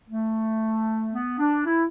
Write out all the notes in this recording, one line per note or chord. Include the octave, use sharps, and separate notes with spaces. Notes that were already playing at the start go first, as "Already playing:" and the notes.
A3
B3
D4
E4